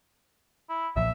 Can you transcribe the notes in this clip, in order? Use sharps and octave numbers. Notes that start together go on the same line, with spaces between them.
E4
B1 A#2 F3 E5